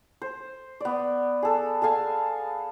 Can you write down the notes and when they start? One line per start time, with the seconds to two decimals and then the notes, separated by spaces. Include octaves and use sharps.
0.22 C5
0.81 B3 D5
1.43 G#4 A4
1.82 G#4 A4 F5 G#5